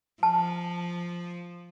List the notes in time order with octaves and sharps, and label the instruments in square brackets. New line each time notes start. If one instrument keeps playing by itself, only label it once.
[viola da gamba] F3 [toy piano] A5